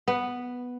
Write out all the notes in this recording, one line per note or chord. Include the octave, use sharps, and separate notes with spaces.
B3